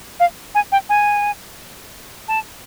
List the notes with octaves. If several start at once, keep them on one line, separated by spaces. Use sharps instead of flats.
F5
G#5
G5
G#5
A5